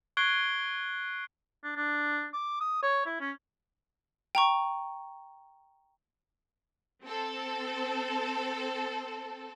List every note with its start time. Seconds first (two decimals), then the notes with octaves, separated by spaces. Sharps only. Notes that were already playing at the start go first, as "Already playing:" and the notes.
0.17 C#6 F#6 G#6 C7 D7 G7
1.64 D4
1.76 D4
2.33 D6
2.60 D#6
2.83 C#5
3.06 E4
3.21 C#4
4.35 G5 A#5 C#6
7.03 C4 A4